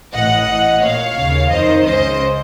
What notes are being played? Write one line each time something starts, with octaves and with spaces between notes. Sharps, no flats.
A1 A2 D#5 F#5
A1 A2
A#1 A#2 C#5 F5
D#2 C#3
F2 D#3 C5 D#5
C#2 C#3 C5 D#5